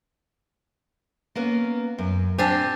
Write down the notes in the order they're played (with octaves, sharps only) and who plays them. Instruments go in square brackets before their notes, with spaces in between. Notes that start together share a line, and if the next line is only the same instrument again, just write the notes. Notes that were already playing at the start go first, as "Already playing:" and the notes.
[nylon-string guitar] A#3 B3 C#4
F#2
[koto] C4 D4 G4 [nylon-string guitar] C5 G#5